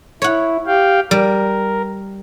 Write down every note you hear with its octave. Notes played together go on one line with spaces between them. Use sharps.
E4 C#5 F#5
G4 F5 G5
G3 A#4